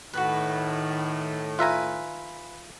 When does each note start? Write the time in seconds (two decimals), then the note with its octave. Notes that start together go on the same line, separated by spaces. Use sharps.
0.13 A2 D#3 F#4 B4
1.59 F4 B4 E5 G#5 A#5